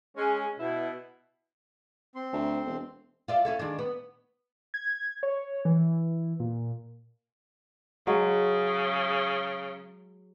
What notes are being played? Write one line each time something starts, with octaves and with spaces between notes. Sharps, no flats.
G#3 C#4
B2 E4
C4 C6
D2
E1
F4 D5 E5
C#4 E4 A4
D#3 G#3 D4
B3
G#6
C#5
E3
A#2
C#3 F#3 G#3